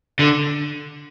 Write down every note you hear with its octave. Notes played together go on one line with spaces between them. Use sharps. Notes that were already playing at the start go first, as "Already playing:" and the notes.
D3